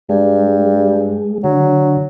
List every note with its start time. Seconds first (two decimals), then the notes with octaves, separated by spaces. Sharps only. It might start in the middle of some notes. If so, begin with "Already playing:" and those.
0.09 G2 G#3
1.44 D3 F#3